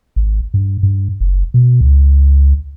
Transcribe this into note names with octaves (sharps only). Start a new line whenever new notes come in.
G#1
G2
G2
F#1
B2
C#2